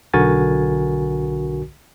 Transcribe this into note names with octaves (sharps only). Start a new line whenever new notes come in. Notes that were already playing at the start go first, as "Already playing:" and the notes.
B1 D3 F#4 A#4 G#5 A6